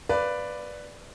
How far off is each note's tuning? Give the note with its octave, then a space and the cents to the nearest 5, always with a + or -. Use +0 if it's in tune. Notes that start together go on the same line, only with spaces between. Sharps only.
B4 +5 D5 +0 F5 -20